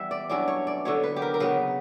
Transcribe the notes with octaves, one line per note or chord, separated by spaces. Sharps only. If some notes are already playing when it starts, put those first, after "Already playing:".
Already playing: E3 G3 B3 E4 E5
D5
G2 F#3 C#4 E4 D5
C#5
D5
D3 F#3 B3 C#5
B4
G4
A#4
A#4
C#3 F#3 B3 B4